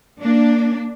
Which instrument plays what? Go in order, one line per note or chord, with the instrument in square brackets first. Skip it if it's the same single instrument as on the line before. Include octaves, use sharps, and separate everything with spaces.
[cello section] A#3 D4